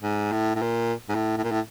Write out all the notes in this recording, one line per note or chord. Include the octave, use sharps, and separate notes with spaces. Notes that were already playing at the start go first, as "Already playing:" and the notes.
G#2
A2
A2
A#2
G#2
A2
A2
A#2
A2